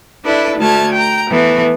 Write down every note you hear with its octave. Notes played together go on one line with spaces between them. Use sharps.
D4 E4 A4 B4
D2 A3 A5 F6 G#6
G5 A#5
E3 A3 B3